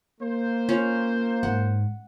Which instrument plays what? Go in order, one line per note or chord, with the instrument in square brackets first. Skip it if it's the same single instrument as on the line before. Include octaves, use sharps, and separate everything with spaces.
[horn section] A#3 C5
[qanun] C#4 F4 F5
[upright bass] G#2 [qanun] F#5